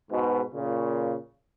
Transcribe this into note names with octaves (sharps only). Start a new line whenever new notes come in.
G#2 B2
A#2 C#3